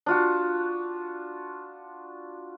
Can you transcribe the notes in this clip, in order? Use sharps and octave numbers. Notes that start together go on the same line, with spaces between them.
D4 F4 F#4